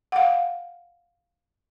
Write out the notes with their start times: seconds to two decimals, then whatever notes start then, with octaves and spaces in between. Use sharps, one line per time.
0.12 F5 F#5